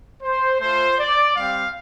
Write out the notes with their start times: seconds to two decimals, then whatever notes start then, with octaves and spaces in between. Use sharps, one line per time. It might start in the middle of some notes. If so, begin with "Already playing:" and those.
0.23 C5
0.60 A3 F4 C5
0.99 D5
1.37 G3 C4 G4 F5